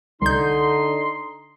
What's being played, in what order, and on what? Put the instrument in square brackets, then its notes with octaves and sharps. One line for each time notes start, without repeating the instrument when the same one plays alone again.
[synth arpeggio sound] C2 G6 [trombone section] D3 [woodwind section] D#4 C6